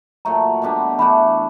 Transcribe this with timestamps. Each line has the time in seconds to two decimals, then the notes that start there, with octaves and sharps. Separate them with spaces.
0.25 A#2 F#3 A3 A#5
0.62 B2 G3 B3 D4
0.99 E3 A3 D4 B5